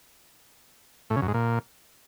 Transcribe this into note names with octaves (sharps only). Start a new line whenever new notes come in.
A2
C#3
F#2
G#2
A#2